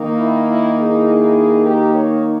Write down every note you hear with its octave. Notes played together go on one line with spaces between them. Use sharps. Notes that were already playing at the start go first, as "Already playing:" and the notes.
Already playing: D#3 A#3 D#4
E4
E4
E4 G#4
G4 A#4
A#4 C#5